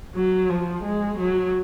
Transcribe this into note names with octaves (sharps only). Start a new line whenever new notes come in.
F#3
F3
G#3
F#3